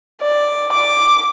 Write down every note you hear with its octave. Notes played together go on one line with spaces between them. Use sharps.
D5
D6